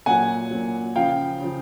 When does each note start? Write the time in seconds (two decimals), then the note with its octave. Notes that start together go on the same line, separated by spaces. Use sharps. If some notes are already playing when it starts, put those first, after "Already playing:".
0.06 A#2 F#3 F#5 G#5
0.51 A#2 F#3
0.96 C#3 F3 F5 G5
1.40 C#3 F3